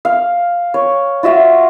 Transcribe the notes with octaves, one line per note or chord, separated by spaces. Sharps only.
F5
C#5
F4 F#4 E5 F5